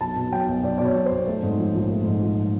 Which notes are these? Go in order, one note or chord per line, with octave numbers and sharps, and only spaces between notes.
B1 A5
B2
F#3 G5
B1
B1 D5
B2 D5
C#5
F#3
C5
B1
A3
G#2
F3
A#1
A3
G#2
F3